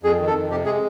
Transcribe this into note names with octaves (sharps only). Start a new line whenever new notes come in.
F2 G#4
D#3
A4
F2
C3 G4
G#3 G#4